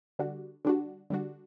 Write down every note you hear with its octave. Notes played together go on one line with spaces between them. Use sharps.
D3 G3 D4 F#4
D3 G3 D4 F#4
D3 G3 D4 F#4